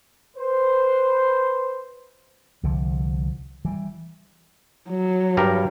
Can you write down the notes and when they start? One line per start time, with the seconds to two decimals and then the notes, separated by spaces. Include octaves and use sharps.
0.36 B4 C5
2.63 C2 D3 F3
3.65 E3 G3
4.89 F#3
5.37 G2 G3 A#4